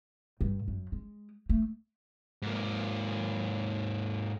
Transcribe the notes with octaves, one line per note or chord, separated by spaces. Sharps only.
G2
F#2
G#3
A3
G#2 A#3